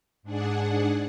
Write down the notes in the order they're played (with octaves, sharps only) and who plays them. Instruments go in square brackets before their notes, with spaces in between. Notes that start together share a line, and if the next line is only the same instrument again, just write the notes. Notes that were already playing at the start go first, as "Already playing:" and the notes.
[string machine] G#2 D4 G#4 F#5